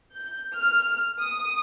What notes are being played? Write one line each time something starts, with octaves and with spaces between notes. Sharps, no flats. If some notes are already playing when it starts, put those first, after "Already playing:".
G6
F6
D#6